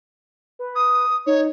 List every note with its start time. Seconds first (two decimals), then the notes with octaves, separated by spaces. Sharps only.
0.59 B4
0.75 D#6
1.26 D#4 C#5